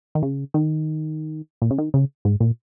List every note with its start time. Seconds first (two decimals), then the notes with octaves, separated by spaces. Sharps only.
0.15 D#3
0.23 C#3
0.54 D#3
1.62 A#2
1.70 C#3
1.78 D#3
1.94 C#3
2.25 G#2
2.40 A#2